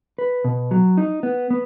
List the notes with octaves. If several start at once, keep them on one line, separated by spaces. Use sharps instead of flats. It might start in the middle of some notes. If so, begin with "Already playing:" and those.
B4
B2
F#3
D#4
B3
B3